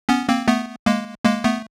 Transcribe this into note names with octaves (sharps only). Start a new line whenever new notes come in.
B3 C#4
A#3 C4
A3 B3
G#3 A#3
G#3 A#3
A3 B3